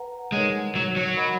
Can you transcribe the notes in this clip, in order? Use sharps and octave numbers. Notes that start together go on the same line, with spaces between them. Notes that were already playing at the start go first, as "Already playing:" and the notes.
Already playing: B4 F#5 A#5
G#3 D#4 A#4 C#5 F#5
F#3
F#3
A#4 D#5 F#5 B5